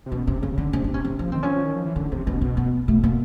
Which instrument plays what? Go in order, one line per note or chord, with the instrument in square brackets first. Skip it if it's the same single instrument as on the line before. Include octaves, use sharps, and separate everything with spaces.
[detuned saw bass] C3
[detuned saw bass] B2 [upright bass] C#4
[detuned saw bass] C3 [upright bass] C#4
[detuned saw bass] C#3 [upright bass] C4
[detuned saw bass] C#3
[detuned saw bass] D3 [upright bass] C#4
[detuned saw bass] C3 [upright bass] C#4
[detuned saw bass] C3 [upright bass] D4
[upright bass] C#4
[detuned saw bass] C3 [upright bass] C#4
[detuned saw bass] F3 [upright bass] C#4
[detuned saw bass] D#3 [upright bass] C4
[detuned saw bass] F3 [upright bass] C#4
[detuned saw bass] F3
D#3
F3
E3
[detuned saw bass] D3 [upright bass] C#4
[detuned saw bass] C3 [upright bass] C#4
[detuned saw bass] B2 [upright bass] C#4
[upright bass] C4
B3
[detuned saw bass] B2 [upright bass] A3
[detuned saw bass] B2 [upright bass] A#3